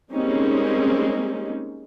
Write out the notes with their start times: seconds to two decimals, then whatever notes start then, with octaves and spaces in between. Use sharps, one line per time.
0.12 G3 G#3 A#3 C4 C#4 D#4